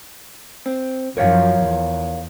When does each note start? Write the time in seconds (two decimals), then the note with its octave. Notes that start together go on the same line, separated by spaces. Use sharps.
0.66 C4
1.17 F#2 F3 A#4 C#5 F5
1.62 E2